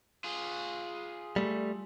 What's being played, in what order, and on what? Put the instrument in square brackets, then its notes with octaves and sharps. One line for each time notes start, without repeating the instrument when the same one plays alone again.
[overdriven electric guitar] F4 G#4
[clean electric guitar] G3 A3